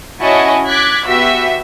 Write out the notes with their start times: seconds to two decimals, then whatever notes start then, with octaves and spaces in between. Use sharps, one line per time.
0.21 C#4 E4 F#4 D#5 G#5 A5
0.68 D6 F#6 G#6 A6 B6
1.07 B3 F#4 G4 E5 E6 B6